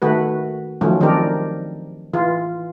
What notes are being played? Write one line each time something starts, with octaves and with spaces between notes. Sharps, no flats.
D#3 A3 F#4 B4
D#3 F3 F#3 A3 C#4
D#3 C4 D4 D#4 G4 A#4
E3 F4